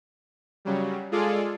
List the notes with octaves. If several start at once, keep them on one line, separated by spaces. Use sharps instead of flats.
C#3 F#3 G3
G#3 F4 G#4 A4 D5